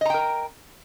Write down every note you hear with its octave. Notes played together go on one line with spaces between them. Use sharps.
A#4 D#5 G5 A#5